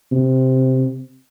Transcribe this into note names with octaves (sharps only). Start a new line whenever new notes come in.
C3